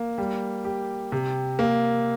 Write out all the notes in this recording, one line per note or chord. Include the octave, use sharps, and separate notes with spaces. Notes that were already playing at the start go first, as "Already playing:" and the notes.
Already playing: A#3
G3
G4
C3
A#3